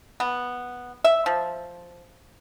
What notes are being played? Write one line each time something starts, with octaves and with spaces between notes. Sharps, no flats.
B3
E5
F3